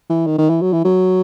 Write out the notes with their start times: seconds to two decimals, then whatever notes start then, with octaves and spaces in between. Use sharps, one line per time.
0.10 E3
0.27 D#3
0.38 D#3
0.49 E3
0.62 F#3
0.73 E3
0.85 F#3